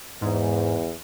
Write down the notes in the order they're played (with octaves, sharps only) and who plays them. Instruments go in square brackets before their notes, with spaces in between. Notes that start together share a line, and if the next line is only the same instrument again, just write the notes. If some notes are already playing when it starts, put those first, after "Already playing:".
[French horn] E2 [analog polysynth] G#2